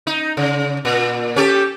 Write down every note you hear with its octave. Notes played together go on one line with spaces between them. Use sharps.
D#4
C#3
A#2
C#4 G4 A4